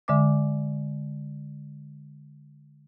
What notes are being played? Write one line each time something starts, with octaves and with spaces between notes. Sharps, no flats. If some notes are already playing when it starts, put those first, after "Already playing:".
D3 G#3 E5 D6